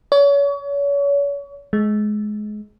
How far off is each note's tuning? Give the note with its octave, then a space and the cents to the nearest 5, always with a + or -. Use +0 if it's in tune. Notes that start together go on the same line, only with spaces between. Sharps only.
C#5 +35
G#3 +25